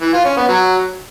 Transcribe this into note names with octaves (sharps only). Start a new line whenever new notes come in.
E3
F4
C#4
B3
F#3